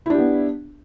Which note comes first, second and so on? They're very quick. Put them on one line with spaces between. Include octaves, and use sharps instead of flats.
E4 D4 G4 B3